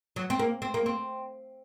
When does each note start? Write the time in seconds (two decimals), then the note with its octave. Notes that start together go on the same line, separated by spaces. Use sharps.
0.16 F#3
0.30 C4
0.39 A#3
0.62 C4
0.74 A#3
0.86 C4